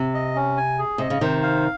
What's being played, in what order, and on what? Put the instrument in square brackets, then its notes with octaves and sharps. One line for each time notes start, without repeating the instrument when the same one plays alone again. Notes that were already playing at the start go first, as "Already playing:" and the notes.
Already playing: [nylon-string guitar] C3
[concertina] D#5
C#4
G#5
G#4
[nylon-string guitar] C3 [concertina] D#5
[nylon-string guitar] C#3
[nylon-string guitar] C3 D#3 [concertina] C5
[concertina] F5